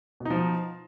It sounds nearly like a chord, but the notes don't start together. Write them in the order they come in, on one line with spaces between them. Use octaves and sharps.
B2 D#4 F3